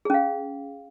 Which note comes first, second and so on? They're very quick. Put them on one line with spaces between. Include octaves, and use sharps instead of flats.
G#4 C#4 F5